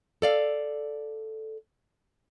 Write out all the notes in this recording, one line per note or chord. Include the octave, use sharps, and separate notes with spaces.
A4 D5 F5